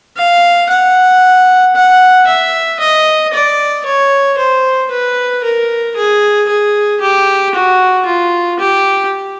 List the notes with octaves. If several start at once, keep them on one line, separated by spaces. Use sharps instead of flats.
F5
F#5
F#5
E5
D#5
D5
C#5
C5
B4
A#4
G#4
G#4
G4
F#4
F4
G4